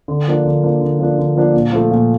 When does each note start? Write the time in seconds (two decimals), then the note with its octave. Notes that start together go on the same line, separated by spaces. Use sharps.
0.08 D3
0.27 F3 A#3 D4
0.45 D3
0.63 F3 A#3 D4
0.81 D3
0.99 F3 A#3 D4
1.18 D3
1.36 F3 A#3 D4
1.54 A#2
1.72 F3 A3
1.91 A#2